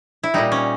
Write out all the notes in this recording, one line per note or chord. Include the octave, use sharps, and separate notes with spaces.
E4
A#2 G3 D#4
C#4